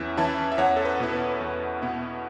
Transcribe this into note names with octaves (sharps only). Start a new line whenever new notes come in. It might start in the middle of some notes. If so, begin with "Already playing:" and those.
Already playing: E2 E3 C#4 E4 E5
E3 C#4 E4 E5 A5
E5
E2 C#5 F#5
A4
B4
B2 B3 E4
B4
E2
B2 B3 E4